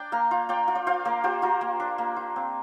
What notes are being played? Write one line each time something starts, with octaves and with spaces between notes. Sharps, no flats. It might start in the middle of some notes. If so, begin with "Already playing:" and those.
Already playing: D4 D5 G5
A#3 F5 A#5
F4
F4 D5 G5
F4
D5
F4 C5 F5
A#3 A#4 D5
F4 G4 C5
A#3 F4 A#4
A#3
D4
A#3
F4
C4